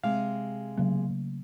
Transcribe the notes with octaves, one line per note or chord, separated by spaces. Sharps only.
C3 G#3 F5
C#3 F#3 A3 A#3